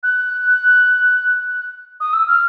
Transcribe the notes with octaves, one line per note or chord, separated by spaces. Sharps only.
F#6
D#6
E6
F6